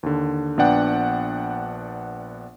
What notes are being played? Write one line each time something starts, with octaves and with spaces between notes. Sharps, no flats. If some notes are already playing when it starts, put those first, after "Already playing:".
D#2 D3
A#1 B3 D4 D5 F#5 G5